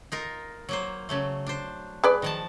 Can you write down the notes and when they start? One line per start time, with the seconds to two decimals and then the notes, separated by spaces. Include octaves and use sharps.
0.12 D#4 F4 A#4
0.69 F#3 A#3 C5
1.09 C#3 F#3 A3
1.47 D4 C5
2.04 G#4 B4 D5
2.22 D#3 F3 A5